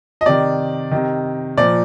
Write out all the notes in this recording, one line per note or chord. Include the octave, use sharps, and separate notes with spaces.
D#5
C3 D#3 D5
C3 D#3
A#2 F3 D5